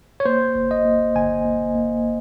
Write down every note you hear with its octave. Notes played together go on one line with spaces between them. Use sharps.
C#5
A#3 C5
G1
D#5
A#3
G1 G#5
A#3
A#3